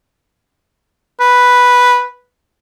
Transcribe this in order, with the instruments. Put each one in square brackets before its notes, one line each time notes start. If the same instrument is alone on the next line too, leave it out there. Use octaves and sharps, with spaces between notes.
[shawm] B4